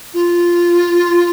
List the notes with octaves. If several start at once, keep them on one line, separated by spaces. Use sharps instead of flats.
F4